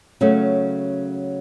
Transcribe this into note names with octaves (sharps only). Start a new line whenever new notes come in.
C#3 F#3 A3 C#4